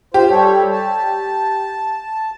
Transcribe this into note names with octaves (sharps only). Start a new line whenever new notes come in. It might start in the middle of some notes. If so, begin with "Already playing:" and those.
F4 G4 C5
G3 A4 C#5
A5